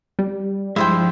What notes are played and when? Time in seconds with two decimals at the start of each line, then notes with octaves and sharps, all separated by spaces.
0.19 G3
0.76 G2 F3 G#3 E4 C5 G5